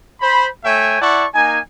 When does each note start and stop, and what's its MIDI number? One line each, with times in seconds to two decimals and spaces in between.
0.20 0.48 72
0.20 0.48 83
0.65 1.00 57
0.65 1.00 73
0.65 1.00 76
0.65 1.00 79
0.65 1.00 80
1.02 1.26 64
1.02 1.26 74
1.02 1.26 78
1.02 1.26 81
1.02 1.26 85
1.34 1.58 58
1.34 1.58 63
1.34 1.58 80